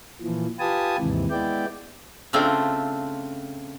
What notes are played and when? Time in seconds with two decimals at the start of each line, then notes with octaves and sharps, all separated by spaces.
0.22 A#2 E3 F3
0.59 F4 G4 B4 G#5 A5 D#6
0.99 D#2 G#2 C3 E3
1.30 G#3 B3 E4 D5 G5
2.33 C#3 A3 C4 D4 F4